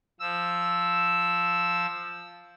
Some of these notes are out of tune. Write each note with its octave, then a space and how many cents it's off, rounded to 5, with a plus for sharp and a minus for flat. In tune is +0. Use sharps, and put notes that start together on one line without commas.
F3 +0 E6 +0